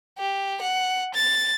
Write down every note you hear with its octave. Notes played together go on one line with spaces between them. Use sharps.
G4
F#5
A6